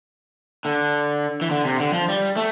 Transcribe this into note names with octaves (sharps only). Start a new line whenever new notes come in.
D3
E3
D3
C3
D3
F3
G3
A3